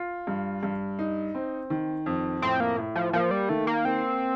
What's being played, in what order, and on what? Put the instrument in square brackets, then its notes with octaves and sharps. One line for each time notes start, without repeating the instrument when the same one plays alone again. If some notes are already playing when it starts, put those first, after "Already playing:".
Already playing: [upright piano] F4
G2
G2
D#4
C4
D#3
F2
[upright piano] A2 [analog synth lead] C4
[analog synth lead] A#3
[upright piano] A2
[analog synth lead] F3
[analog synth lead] F3 [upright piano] A#3
[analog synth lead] G3
[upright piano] D#3 [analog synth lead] A3
[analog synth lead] A#3
[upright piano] A#3 [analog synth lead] C4